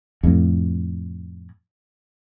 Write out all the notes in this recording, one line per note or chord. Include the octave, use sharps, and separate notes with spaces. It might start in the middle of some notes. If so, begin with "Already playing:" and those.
F2 A2